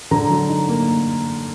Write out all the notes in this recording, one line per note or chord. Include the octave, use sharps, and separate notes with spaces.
D3 A#5
F#3
D#4
A#3